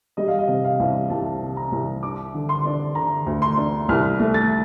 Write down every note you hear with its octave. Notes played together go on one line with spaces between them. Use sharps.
G3 D#5
F5
D#5
C3
F5
C2
C2 A5
C3
A#5
C2
D4 D6
D3
C6
D4
D3 A#5
D2
C6
D4
C2 F6
A3
A6